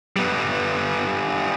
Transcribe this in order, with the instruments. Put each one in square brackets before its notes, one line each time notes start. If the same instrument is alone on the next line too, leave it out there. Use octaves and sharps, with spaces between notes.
[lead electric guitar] G3 B3